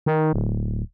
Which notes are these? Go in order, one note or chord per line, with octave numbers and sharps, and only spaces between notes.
D#3
D1